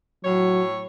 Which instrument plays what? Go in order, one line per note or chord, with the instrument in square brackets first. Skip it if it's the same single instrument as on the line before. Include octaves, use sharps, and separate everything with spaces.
[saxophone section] A2 C#5 [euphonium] F#3